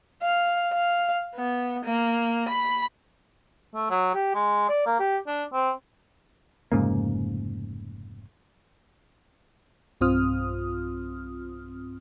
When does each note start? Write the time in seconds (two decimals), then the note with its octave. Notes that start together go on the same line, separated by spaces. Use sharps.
0.22 F5
0.73 F5
1.35 B3
1.85 A#3
2.49 B5
3.74 A3
3.90 F#3
4.14 G4
4.35 G#3
4.69 D5
4.86 A#3
5.00 G4
5.27 D4
5.53 C4
6.72 F1 G#2 C#3 A#3
10.01 B1 G2 C4 F4 D#6 F6